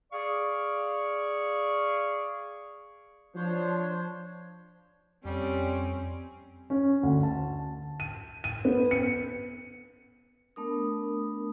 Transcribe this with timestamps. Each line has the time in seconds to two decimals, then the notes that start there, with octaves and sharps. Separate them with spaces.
0.13 G#4 D5 F5 C#6
3.36 F3 D4 C5 C#5
5.25 F2 G3 C4 C#4
6.70 C#4
7.03 D2
7.23 A5
8.00 D#7
8.44 D#7
8.65 B3
8.91 C#7
10.56 A3 B3 D4 A#4 D#6